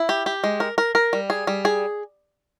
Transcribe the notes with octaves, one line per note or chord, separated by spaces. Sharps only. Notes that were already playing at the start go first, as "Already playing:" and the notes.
Already playing: E4
G4
G4
G#3
A#4
A#4
A#4
G3
G#4
G3
G#4